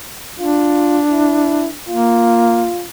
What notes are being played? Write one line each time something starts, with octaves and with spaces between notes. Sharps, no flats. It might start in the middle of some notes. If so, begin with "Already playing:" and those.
D4 F4
E4
A#3 F4